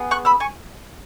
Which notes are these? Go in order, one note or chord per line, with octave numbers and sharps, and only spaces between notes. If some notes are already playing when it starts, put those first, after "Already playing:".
Already playing: B3 G#4
C#6 F#6
B5 E6
G#5 C#6